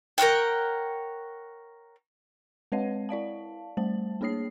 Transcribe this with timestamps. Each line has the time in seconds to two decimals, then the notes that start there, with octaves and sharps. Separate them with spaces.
0.18 A#4 C#5 F#5 G5
2.72 G#3 C4 B4 C#5 D#5 F#5
3.09 E4 D5 F5 A5
3.77 G3 A3 C5 A5
4.21 A#3 D4 G#4 C#5 D#6 C7